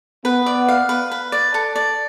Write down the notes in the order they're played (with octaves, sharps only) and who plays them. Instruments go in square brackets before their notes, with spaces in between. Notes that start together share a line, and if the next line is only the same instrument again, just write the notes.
[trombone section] B3 [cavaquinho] B4
[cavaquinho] D5
F5
B4
B4
D5
A4
D5